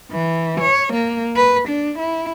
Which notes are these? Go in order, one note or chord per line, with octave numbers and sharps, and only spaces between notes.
E3
C#5
A#3
B4
D4
E4